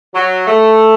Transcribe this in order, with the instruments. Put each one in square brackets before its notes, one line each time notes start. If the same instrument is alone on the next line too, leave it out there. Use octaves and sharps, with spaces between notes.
[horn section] F#3
A3